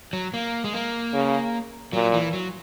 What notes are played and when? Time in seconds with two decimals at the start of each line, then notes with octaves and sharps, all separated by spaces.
0.13 F#3
0.34 A#3
0.64 G#3
0.73 A#3
1.13 C#3
1.93 A#2 F#3
2.14 E3
2.33 F#3